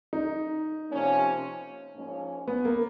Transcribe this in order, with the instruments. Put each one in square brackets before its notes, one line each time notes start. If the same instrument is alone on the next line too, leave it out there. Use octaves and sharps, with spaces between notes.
[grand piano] D#4
[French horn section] C3 F3 A#3 C#4
G#2 F3 A#3 C#4
[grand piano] B3
A#3